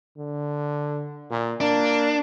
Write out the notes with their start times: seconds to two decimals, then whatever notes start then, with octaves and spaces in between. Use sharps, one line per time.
0.17 D3
1.30 A#2
1.60 A#3 D4